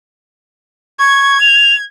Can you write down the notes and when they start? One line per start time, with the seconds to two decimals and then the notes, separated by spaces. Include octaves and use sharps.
0.99 C#6 G#6
1.41 F7